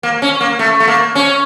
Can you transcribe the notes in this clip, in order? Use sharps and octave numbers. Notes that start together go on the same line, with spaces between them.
A#3
C#4
A#3
A3
A3
A#3
C#4